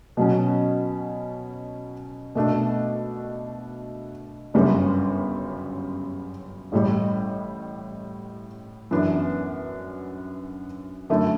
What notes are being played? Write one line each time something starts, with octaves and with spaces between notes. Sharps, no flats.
B2 F#3 C#4
B2 A3 D4
G1 F#2 C#3 G3 B3
A1 A2 G3
F#2 E3 B3 D4
F#2 D3 A3 E4